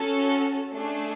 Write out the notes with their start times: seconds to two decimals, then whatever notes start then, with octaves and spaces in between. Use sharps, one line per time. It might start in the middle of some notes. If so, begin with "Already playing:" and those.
Already playing: C#4 F#4 A4
0.72 A3 D4 G#4